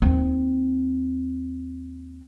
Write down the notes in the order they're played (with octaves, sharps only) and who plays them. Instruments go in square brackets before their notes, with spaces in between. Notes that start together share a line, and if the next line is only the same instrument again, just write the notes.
[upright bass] D#2 C4